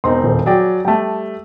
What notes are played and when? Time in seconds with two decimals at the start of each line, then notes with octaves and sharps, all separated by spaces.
0.04 E1 C4 D#4 C6
0.24 D#1
0.46 F#3 G#4 D5 G5
0.85 G3 A3 G5 A5